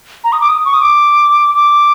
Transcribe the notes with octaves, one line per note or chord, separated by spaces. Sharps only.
A#5
D#6
D6
D#6
C#6
D#6
D6
D6